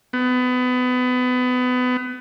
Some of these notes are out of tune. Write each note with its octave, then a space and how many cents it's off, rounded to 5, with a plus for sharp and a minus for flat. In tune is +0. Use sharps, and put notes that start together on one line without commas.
B3 +25